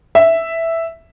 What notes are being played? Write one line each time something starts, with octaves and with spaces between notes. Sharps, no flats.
E5